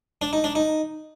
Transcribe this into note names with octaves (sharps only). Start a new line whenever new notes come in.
D4
D#4
D4
D#4